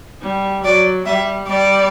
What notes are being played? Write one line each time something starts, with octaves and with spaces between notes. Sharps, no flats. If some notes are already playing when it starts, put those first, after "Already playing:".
G3
F#3 D5
G3 E5
G3 D5